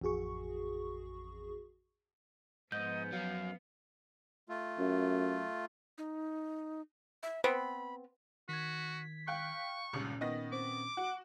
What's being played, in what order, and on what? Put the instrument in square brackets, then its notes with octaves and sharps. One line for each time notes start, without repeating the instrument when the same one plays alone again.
[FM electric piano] A1 F2 F#4 G#4 C#6
[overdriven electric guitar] G#2 [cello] F3 B3 [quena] D#5 [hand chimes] G6
[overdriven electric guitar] F#2 F#3 [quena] F5
[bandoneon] A3 F4
[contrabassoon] F#2
[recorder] D#4
E5
[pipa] B3 C4 [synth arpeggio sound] B4 [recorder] B5
[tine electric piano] D#3 G#6 [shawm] F#4 [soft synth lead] B6
[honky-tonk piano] F5 G5 F#6 [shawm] C#6
[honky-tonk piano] G#1 C#2 G2 [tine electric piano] A#2 C#4
[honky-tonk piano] D#3 B3 A#6 [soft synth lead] D#5
[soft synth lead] C4 [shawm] D6
[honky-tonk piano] F#4 [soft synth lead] F#5